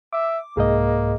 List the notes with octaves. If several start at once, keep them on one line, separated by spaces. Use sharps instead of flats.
E5 D6
C2 G#2 A#3 G#4 D#5